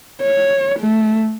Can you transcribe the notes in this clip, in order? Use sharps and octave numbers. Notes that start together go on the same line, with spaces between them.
C#5
A3